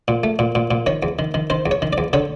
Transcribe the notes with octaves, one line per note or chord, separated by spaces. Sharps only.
A#2
A3
A#2
A#2
A#2
D#3 C#5
E2
D#3
D#3
D#3 C5
E2
C#5
D#3
D5
E2
D3 C#5